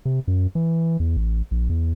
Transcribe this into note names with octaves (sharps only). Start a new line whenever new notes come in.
C3
F#2
E3
E2
A1
A#1
E2